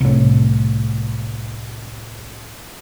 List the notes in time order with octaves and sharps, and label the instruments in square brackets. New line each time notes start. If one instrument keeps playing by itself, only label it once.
[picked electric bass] C2 A2